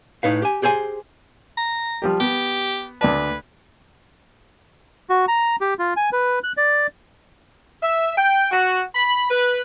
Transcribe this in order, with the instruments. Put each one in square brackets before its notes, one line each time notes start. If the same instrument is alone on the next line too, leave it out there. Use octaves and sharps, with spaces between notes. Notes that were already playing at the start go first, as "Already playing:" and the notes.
[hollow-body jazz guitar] A2 D#4 B4 F5
G4 G#5
G4 G#4 C5 E5 G#5
[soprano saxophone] A#5
[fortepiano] F3 G3 G4
[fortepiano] B3 [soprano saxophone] G4
[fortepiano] D2 D5 A5 [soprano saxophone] B4
[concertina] F#4
A#5
G4
F4
G#5
B4
F#6
D5
[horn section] E5
G5
F#4
B5
B4